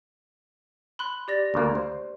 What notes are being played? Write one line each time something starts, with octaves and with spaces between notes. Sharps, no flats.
B5 C6 F#6
G4 D5 A#6
D2 A#3
C5